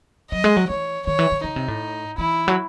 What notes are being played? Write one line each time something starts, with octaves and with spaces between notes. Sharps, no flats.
F#3 D#5
G#3
F#3
E3 C#5
D#3 C#5
E3
D#3
C#3 D#4
C3
A2
E3 E4
F#3